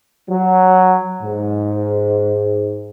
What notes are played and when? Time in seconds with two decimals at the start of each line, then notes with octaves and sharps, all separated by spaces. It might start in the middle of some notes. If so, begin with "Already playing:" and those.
0.29 F#3
1.21 G#2